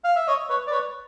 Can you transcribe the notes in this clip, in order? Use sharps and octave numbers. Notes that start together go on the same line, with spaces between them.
F5
E5
C#5 D#5
B4 C#5
D5
B4 C#5